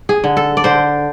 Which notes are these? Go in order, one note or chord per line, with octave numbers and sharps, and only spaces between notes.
G#4
D3
A4
D5
D3 C5